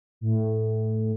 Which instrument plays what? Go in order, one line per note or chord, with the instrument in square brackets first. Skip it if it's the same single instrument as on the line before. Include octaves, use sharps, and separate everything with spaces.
[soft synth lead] A2